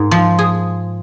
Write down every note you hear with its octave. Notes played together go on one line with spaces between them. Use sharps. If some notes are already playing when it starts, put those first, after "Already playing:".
Already playing: G#2 A#4
F3
G#4